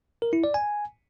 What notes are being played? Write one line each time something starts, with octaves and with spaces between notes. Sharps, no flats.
A#4
E4
D5
G#5